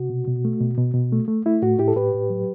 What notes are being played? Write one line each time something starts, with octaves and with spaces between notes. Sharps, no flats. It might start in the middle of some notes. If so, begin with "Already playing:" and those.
Already playing: C3 F#4
B2
B2
A3
B2
B2
B2
A3
A3
A3 E4
A2 F#4
A2 E4 G4
A4
A2 G4 B4
A2
F#3